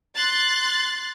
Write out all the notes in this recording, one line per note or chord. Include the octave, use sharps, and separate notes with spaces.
C6 F#6 A6